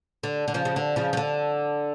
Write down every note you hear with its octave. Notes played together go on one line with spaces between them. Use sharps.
D3
D3
C#3 F3
C#3
D3
C#3 F3
F3
D3